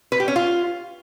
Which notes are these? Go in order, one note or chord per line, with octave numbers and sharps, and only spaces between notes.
B4
G4
C#4
F4